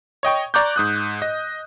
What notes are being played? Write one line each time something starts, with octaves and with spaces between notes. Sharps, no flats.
C#5 D#5 G5 C#6
D5 A#5 C#6 D6 F#6 G6
G#2 D#6 F#6
D#5